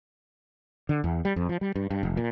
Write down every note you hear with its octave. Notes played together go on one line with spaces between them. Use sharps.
D3
E2
G3
F2
F3
G3
G2
G2
F1
A#2